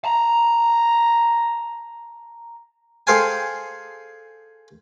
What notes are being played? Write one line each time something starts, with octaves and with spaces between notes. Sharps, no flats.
A5 A#5
G#4 A4 C5 F5 G5 G#5